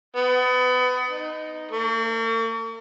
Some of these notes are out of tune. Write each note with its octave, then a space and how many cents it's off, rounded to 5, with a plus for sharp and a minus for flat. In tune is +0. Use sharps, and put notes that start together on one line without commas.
B3 +30
D#4 -5
A#3 -45